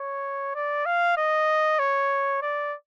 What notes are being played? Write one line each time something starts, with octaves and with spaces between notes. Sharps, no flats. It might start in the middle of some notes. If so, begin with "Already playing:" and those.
Already playing: C#5
D5
F5
D#5
C#5
D5